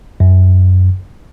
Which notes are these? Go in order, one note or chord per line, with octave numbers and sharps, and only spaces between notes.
F#2